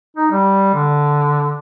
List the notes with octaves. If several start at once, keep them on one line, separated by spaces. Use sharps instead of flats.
D#4
G3
D3